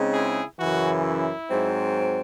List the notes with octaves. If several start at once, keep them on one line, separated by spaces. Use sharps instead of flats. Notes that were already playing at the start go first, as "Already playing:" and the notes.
Already playing: C#3 G#3 C4 D#4
E4 G#4
F#2 C#3 E3 F#4
E4
G#2 F#3 C4